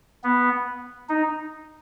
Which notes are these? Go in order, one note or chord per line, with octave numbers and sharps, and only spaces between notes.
B3
D#4